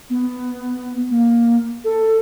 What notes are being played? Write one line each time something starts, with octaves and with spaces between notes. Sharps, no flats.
B3
A#3
A4